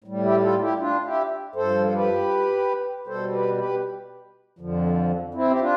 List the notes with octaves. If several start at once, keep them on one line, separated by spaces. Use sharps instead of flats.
A2 G3
E4 G4
F4 A4
E4 G4
D4 F4
E4 G4
G2 F3 A4 C5
A4
G4 B4
B2 G3 A4 C5
G4 B4
G4 B4
F2 D3 F3
C4 E4
G4
D4 F4